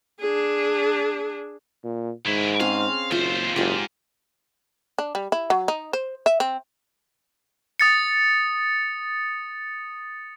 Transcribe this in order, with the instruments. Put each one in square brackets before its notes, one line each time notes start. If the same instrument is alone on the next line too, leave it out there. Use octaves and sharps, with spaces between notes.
[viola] D4 G#4
[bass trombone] A#2
[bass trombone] G#2 [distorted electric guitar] D#3 E4
[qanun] C4 C#4 G#4 [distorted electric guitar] F5
[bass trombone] F#1 [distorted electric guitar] D#2 C5 [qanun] F4 E5
[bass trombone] F#1 [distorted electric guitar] G#2 [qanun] F4 G4
[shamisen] D4
G3
E4
F#3
D#4
C5
E5
C4
[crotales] D#6 A6 C#7